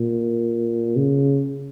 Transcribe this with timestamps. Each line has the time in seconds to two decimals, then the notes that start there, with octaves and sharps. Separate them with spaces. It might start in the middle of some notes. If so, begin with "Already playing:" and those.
Already playing: A#2
0.96 C#3